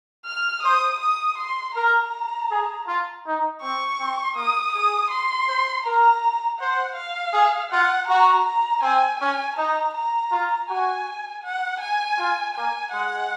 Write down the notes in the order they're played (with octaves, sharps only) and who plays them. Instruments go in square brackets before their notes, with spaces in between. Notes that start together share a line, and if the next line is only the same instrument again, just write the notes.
[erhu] F6
[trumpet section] C5 [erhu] D#6
[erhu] D#6
C6
[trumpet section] A#4 [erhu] A#5
[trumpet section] G#4
F4
D#4
[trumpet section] C4 [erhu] C#6
[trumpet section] C4
[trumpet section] A#3 [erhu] D#6
[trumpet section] G#4 [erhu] D#6
[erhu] C6
[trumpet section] C5
[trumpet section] A#4 [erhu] A#5
[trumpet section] C5 [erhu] F#5
[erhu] F5
[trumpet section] G#4
[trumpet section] F4 [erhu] F#5
[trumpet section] F#4 [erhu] A#5
[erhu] A#5
[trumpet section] C4 [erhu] G#5
[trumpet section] C#4 [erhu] G#5
[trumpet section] D#4 [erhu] A#5
[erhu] A#5
[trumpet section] F4
[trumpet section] F#4 [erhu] G#5
[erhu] F#5
G#5
[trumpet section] F4
[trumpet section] A#3 [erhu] G#5
[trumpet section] G#3 [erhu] F#5